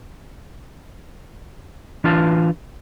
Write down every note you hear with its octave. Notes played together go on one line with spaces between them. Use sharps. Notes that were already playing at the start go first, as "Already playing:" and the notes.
E3 D4 F4 B4 F5 A5